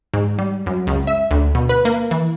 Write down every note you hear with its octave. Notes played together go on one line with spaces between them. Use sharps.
G#2
G3
F#2
C#2
E5
D2
B2
B4
A#3
E3